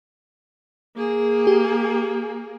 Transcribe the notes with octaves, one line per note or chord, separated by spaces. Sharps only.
A#3 G#4
G4